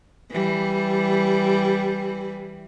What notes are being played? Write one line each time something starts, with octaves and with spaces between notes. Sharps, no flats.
E3 G3